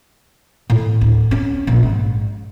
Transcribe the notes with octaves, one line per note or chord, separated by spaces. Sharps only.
A2
D2
C#4
A#1
G#2